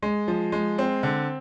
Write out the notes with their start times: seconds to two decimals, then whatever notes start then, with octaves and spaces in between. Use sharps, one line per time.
0.03 G#3
0.28 F3
0.52 G#3
0.78 C4
1.03 D3